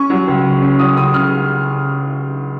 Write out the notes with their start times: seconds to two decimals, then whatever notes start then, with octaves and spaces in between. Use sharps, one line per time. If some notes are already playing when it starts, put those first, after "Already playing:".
Already playing: C#4 C#6
0.10 F#3
0.27 C#2
0.44 C#3
0.62 C#4
0.79 F#3 D#6
0.96 C#2 D#6
1.14 C#3 F6